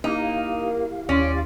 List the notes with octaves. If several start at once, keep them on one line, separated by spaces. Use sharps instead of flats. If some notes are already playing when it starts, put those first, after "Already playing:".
A#3 D#4 E4 G4 F5
D#2 C#4 D5 C6